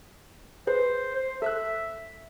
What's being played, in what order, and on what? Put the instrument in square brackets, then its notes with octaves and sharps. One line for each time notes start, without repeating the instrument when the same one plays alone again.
[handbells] G#4 B4 [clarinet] C5
[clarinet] C5
[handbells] A4 E6 F#6 [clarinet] E5